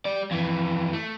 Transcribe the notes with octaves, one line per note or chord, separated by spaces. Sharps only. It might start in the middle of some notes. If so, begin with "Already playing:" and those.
G3 D5
F2 E3
A3